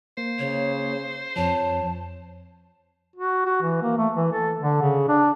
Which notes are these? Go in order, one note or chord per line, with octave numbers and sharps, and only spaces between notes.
A#3 C5
C#3 C#5
F2 F3 C#5 A5
F#4
F#4
E3
A#3
A3
E3
A4
D3
C#3
D4